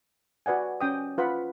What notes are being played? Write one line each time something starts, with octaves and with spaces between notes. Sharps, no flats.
F#4 B4 D5 F#5 G#5
C#4 G5 D#6
F4 B4 F#5 B5